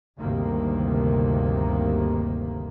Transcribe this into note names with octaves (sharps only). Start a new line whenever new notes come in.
G1 D2 C3 D#3 A#3